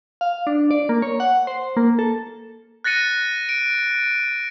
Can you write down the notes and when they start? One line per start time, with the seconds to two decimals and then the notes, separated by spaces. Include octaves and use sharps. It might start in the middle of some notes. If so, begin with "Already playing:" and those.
0.21 F5
0.47 D4
0.71 D5
0.89 A#3
1.02 C#5
1.20 F#5
1.47 C5
1.77 A#3
1.99 A4
2.84 F#6 A6 A#6 C#7 D#7
3.49 D7